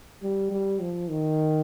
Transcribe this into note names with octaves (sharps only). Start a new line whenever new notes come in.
G3
G3
F3
D#3